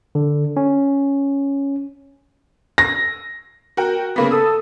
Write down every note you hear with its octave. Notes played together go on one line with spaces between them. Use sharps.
D3
C#4
A#6
F#4 A#4 G5
C#3 A#3 B3 B5
A4 D#6 E6